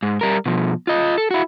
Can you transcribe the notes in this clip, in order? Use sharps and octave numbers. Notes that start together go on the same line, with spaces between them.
G#2
G3 A#4
B2 F3
F4 D#5
A4
E4 F#4